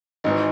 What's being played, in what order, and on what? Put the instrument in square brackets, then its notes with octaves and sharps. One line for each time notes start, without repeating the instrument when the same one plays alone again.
[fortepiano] G#1 G#2 E3 [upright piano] D#4